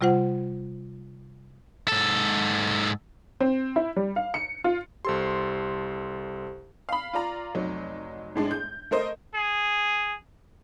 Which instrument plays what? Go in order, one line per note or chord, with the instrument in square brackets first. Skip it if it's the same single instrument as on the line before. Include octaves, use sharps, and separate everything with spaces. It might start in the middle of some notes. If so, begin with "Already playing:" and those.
[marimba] C3 G3 F4 C5 F#5
[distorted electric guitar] G#2 A4
[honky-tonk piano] C4
E4
G3
F5
C#7
F4
[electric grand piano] C2 A4 C6 [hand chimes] G4 C5
[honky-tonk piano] F5 B5
F4 D5 A#5
F1 F#3 D#4
A2 G#3 D4
G6
A3 A#4 C5 D#5
[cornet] G#4